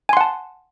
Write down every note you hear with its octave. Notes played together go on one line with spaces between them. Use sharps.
F#5 G#5 A5 C6